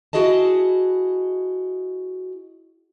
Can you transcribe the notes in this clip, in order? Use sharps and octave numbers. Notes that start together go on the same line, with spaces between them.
E4 F#4 G#4 D#5 A5